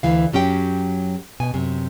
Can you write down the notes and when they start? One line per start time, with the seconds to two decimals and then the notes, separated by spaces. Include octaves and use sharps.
0.03 D2 E3 F5
0.33 F#2 F#3 C#4 G4 G5
1.40 B2 G#5
1.54 F#2 C3